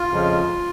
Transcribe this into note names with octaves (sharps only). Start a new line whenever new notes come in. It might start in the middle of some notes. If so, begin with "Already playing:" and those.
Already playing: F4
F2 C#3 F3 G#3